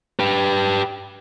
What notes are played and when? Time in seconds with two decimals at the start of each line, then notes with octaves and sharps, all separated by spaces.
0.19 G4 B4